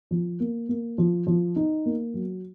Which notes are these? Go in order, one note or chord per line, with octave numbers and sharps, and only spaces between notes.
F3
A#3
A#3
F3
F3
D#4
A#3
F#3